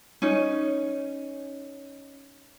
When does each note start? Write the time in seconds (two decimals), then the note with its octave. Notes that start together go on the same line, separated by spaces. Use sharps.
0.22 C#4 D#4